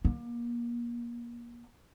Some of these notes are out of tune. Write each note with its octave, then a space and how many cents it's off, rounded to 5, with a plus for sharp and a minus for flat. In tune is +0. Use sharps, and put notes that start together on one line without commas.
A#3 +30